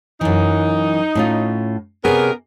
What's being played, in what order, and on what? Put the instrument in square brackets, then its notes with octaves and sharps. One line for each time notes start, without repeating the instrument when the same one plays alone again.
[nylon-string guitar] F#2 E3 [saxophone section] D#4
[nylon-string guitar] A2 C#4 F4
[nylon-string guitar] C3 G#4 [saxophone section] B3 C#4 A#4